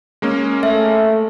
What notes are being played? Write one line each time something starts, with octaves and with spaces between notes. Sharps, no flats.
G#3 A#3 C#4
A3 E5